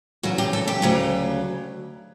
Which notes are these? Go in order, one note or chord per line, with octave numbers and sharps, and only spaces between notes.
E2 C#3 F#3 F#4
G4
A4
G4
D2 C#3 F#3